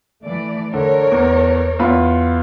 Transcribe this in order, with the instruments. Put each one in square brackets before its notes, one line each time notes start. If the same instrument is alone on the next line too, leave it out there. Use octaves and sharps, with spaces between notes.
[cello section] E3 A3 D5
[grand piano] D3 [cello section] A#4 C#5 D5
[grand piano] E2
E2 F4 B5